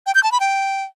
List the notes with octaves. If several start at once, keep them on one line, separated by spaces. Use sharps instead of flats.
G5
G6
A5
B5
G5